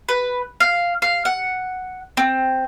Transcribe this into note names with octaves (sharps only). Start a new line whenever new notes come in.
B4
F5
F5
F#5
C4